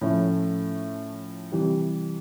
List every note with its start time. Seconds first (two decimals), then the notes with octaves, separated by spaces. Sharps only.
0.01 A2 F3 A3 C#4 E4
1.52 C3 E3 G3